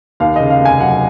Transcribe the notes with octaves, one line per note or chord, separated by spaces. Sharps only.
D#2 F5
C#3 D#5
F5
F1 G#5
F#3 F#5